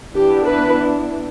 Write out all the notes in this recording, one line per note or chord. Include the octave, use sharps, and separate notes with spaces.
E3 B3 D4 G4
B4